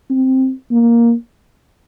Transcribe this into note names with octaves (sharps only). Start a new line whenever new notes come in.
C4
A#3